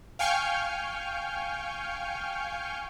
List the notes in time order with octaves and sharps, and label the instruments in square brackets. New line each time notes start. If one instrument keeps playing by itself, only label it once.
[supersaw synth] F5 G5 G#5 C#6 F6 G6